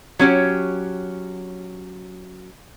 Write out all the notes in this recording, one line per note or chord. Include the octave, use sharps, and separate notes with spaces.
F#3 C#4 G4